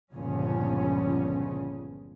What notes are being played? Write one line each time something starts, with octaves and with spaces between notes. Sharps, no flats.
G1 C#2 A#2 C#3 F3 C#4